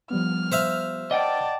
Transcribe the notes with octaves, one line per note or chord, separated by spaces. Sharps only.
F3 G3 B3 F6
C5 E5 F5
D5 D#5 F#5 G5 A5